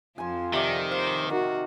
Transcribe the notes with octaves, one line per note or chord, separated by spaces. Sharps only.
F2 F3 G#5 C6
C3 D#3 D5
C5 F5
D#3 F#4